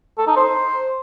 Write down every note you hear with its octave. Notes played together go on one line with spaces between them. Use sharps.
A4
D#4
C5